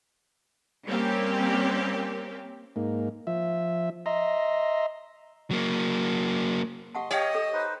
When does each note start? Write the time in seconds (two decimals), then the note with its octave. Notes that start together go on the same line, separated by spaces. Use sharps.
0.86 G3 A#3 C4 C#4 G4
2.76 G#2 A#3
3.27 F3 E5
4.06 D#5 E5 A#5 C6
5.51 F#3 A#3
6.95 G4 D#5 F#5 A5 C6
7.11 G4 C#5 D#5 F5 G5 G#5
7.35 A4 E6
7.53 D#4 B4 C5